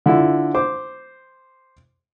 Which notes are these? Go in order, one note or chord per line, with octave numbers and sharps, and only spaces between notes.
D3 E4 F4
C5 D6